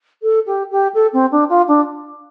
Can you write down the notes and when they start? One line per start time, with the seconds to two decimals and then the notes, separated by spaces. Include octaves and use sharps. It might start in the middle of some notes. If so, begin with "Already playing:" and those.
0.22 A4
0.46 G4
0.71 G4
0.94 A4
1.13 C4
1.31 D4
1.49 F4
1.67 D4